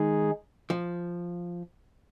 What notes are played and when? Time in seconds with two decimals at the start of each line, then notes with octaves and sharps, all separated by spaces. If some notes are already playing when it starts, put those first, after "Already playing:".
Already playing: D#3 G#3 D#4 G#4
0.70 F3